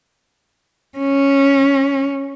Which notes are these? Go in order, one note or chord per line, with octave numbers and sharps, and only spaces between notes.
C#4